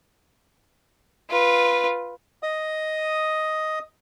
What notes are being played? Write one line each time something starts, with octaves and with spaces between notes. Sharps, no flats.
F4 B4
D#5 D#6